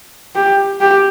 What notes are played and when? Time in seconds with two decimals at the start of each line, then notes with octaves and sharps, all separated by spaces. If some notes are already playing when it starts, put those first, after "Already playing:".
0.35 G4
0.80 G4